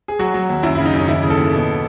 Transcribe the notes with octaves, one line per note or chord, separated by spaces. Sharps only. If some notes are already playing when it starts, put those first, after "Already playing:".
G#4
F#3 F#4
F#3
D#2
F#2 E4
C#3 E4
D#4
F#2
D#4
D#2 E4
C#3
A4
D#2
B2